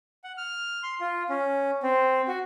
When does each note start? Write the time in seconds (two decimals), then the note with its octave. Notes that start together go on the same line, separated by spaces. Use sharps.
0.24 F#5
0.37 F6
0.83 C6
1.00 F4
1.29 C#4
1.83 C4
2.28 F#4